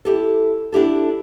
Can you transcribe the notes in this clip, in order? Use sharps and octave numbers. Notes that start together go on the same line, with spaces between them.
E4 G4 A4
D4 E4 G4 A4